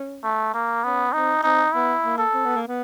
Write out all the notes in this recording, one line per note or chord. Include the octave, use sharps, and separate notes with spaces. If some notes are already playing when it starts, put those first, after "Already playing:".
Already playing: C#4
A3
A#3
B3 C#4
C4 D#4
C4 D#4
B3 E4
A#3
A4
C4
B3
A#3
B3